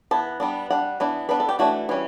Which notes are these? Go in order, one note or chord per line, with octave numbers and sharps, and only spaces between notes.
E3 B3 A5
G3 B3 D4
G3 D4 F#5
E3 B3 D4
G3 B3 D4 B4
A4
G4
E3 A3 D4 F#4
E3 G3 C#4